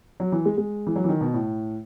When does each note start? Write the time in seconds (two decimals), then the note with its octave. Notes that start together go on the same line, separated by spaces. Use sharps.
0.20 F#3
0.32 E3
0.45 G#3
0.57 G#3
0.87 E3
0.96 F#3
1.04 E3
1.09 D#3
1.21 B2
1.34 A2